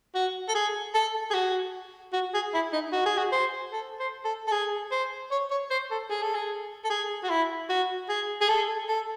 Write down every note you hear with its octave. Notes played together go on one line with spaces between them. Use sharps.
F#4
A4
G#4
A4
G#4
F#4
F#4
G#4
E4
D#4
F#4
G#4
F#4
C5
A4
C5
A4
A4
G#4
C5
C#5
C#5
C5
A4
G#4
A4
G#4
A4
G#4
F#4
E4
F#4
G#4
G#4
A4
A4